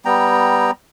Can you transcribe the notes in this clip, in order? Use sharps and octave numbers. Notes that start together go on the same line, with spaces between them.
G3 B3 G5 A#5